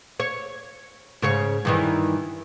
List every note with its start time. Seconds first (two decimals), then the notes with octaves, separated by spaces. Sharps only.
0.20 C#5
1.22 G#2 C#3 C#5
1.65 G2 D#3 E3